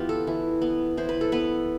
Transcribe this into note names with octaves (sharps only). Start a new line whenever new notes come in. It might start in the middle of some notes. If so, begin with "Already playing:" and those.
Already playing: E3 B3 F4 G4 B4
A4
E3
B3
E3 C5
B4
A4
B3 B4